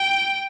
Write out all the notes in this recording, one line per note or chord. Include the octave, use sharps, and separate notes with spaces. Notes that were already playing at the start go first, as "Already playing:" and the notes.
Already playing: G5